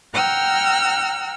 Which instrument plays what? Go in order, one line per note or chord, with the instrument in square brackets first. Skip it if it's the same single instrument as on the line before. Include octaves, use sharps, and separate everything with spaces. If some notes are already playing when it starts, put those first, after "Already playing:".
[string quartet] F#5 G5 A#5 E6 F6